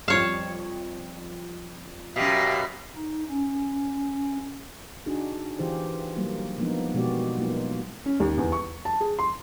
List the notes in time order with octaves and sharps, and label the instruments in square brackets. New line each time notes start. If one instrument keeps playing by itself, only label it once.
[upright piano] F2 G3 E7 [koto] C#5 F5
[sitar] F#2 B2 [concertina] G4 E5 F5
[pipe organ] D#4
C#4
[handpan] D4 D#4 F#4 G#4
E3 F4 G4 G#4 C5
F#3 G3 A#3
F3 G#3 A#3 B3 D4 D#4
B2 G#3 B3 F#4 G4 D5
F#3 A#3 B3 D#4 F4
[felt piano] C#4
D#2
E2
C#6
A5
G#4
C6